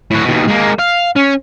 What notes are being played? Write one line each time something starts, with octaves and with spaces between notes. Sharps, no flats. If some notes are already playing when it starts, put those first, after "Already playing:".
A2 F#4
D#2 B2
G#3 A#3
F5
C#4